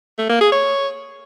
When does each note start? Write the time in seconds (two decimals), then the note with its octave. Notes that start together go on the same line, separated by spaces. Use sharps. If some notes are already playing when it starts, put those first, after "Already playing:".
0.18 A3
0.30 A#3
0.41 G#4
0.52 C#5